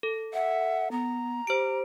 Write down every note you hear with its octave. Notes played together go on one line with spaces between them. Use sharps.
A4
E5 F#5
B3 A#5
G4 C5 D7